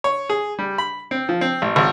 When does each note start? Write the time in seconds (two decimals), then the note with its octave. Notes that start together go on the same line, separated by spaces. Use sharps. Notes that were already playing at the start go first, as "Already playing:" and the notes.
0.04 C#5
0.30 G#4
0.59 G3
0.78 B5
1.11 C4
1.29 F3
1.41 C4
1.62 A1
1.76 G#1